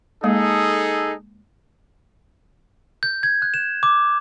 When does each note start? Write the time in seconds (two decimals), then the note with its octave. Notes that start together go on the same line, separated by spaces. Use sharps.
0.24 G#3 A#3 D#4 G#4 A4
3.03 G6
3.23 G#6
3.42 F#6
3.54 E7
3.83 D6